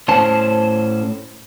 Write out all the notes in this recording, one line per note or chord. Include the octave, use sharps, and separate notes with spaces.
A2 C#4 C5 A5